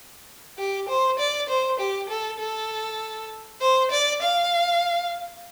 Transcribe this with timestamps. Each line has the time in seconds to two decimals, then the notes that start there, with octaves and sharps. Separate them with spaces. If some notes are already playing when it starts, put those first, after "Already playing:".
0.58 G4
0.88 C5
1.19 D5
1.49 C5
1.80 G4
2.09 A4
2.39 A4
3.61 C5
3.92 D5
4.22 F5